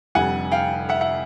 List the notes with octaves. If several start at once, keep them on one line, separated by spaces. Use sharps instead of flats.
F1 F2 D3 G3 F#5 G#5
F5 G5
E5 F#5
E5 F#5